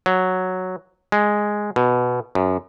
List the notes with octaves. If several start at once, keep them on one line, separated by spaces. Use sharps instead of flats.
F#3
G#3
B2
F#2